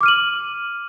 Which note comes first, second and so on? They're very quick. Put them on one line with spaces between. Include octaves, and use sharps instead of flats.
D6 F6 D#7 F#7